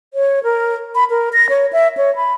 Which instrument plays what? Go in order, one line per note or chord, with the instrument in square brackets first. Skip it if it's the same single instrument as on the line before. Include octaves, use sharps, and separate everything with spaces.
[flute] C#5
A#4
B5
A#4
A#6
C#5
E5
C#5
B5